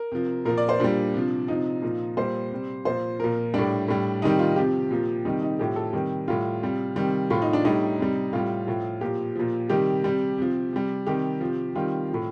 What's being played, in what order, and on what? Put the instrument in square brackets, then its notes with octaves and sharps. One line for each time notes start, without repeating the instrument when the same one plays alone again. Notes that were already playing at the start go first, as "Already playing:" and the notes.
Already playing: [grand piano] A#4
C3 F3
A#2 F3 A#4
D5
C5
A#2 G3 D4
C3 F3
C3 F3 D#4
A#2 F3
A#2 G3 C5
C3 G3
A#2 F3 C5
A#2 F3 A#4
A2 G3 D4
A2 G3
C3 D#3 G3 D#4
F4
C3 F3 G4
A#2 F3
C3 D#3 G3 D#4
D#4
A2 F3 G4
A4
C3 D#3 G3
A2 G3 F4
C3 G3
C3 D#3 G3
A2 F3 F4
D#4
D4
A2 G3 D#4
C3 G3
A2 G3 F4
A2 F3
A#2 F3 G4
A#2 F3
C3 D#3 G3 G4
C3 G3
C3 F3
C3 G3
C3 D#3 G3 G4
C3 F3
C3 D#3 G3 F4
A2 F3